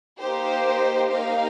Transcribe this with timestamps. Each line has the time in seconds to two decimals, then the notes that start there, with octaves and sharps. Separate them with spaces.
0.19 A#3 D#4 G4 C5
1.11 A#3 D#4 G4 F5